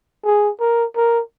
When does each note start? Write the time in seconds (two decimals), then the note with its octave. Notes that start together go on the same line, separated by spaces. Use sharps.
0.25 G#4
0.60 A#4
0.96 A#4